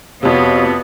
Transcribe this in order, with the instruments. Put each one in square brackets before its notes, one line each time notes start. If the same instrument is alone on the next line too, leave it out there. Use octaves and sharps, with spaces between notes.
[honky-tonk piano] F2 C3 [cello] B3 [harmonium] F#4 C#5 F5